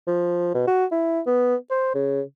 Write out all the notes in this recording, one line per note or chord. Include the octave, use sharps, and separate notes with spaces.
F3
B2
F#4
E4
B3
C5
C#3